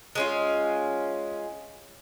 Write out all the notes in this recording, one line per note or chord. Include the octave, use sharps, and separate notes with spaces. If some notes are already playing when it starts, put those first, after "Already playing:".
G#3 C#4 F4